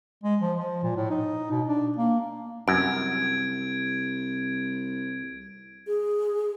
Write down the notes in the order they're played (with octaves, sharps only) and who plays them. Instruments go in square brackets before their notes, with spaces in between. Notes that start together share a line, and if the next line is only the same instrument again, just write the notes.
[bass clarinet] G#3
F3
F3
A#2
A2
D#4
B2
D4
A#3
[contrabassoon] C2 [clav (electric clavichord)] F#2 [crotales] G#6 D7
[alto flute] G#4